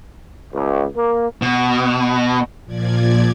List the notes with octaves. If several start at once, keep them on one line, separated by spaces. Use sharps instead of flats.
C#2
A#3
B2
A#2 F3 D5 G#6